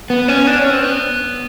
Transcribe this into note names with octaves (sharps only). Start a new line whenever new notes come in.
B3
C#4
D4
C#4
C4
B3